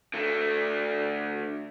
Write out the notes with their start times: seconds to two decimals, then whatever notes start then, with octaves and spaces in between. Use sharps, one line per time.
0.14 D3 A3